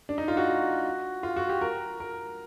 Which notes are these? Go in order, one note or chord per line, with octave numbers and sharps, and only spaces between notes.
D4
D#4
F4
F#4
F4
F#4
G4
A#4
A#4